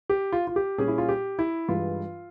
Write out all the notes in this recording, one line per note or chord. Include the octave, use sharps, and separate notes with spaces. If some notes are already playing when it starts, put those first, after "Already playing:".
G4
F4
F4
G4
A#2 G3 C#4 G#4
E4
F4
G4
E4
G2 E3 G#3 F4